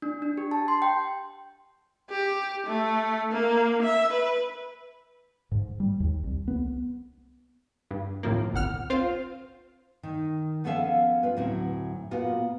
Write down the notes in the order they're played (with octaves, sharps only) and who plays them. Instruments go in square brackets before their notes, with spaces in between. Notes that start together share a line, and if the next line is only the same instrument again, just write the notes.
[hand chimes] D4
D4
G4
A5
C6
G5
[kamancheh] G4
A3
A#3
E5
B4
[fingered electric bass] G#2
G3
D#2
C2
B3
[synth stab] G2
D#2 A2 C3 F3 A#3
G1 C2 F#5 F6
C4 F4 C5 F5
[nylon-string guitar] D#3
F3 B3 C#4 A4 E5 F5
F4 B4
D2 A2 F#3 C4 E4
A#2 B3 F4 F#4